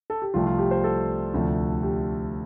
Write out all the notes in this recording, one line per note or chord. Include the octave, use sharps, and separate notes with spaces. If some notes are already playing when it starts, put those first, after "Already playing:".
A4
G4
C2 C3 F3 A3 F4
F4
G4
C5
A4
D2 C3 F3 A3
G4